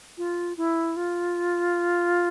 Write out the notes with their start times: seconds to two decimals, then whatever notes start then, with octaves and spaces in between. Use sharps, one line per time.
0.18 F4
0.57 E4
0.96 F4